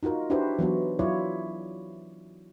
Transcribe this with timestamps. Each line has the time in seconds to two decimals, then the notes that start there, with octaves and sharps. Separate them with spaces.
0.03 D#4 F4 F#4 A#4
0.30 D4 E4 F#4 G4 B4 C5
0.59 E3 F#3 B3 F#4
0.99 F#3 E4 F4 C#5 D5